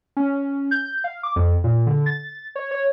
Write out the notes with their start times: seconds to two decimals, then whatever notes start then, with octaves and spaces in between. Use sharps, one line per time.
0.17 C#4
0.71 G6
1.04 F5
1.23 D6
1.36 F2
1.64 A#2
1.87 D3
2.06 A6
2.56 C#5
2.71 C#5